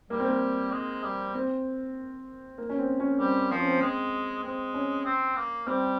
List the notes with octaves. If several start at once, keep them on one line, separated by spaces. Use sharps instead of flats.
G3 A#3
C4
A#3
G#3
G3
C4
A#3
C#4
C4
C#4
G3 C4
F3 C4
C#4
C4
G#3 C4
G#3 C4
C#4
C4
A#3
G3 C4